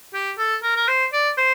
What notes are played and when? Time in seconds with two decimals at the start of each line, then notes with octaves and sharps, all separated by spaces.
0.14 G4
0.38 A4
0.63 A#4
0.76 A#4
0.88 C5
1.13 D5
1.37 C5